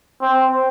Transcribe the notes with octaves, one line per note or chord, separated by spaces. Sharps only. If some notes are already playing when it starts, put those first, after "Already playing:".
C4